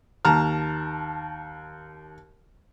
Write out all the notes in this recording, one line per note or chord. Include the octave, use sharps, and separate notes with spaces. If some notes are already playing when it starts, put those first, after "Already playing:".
D#2 A5 A#5 F6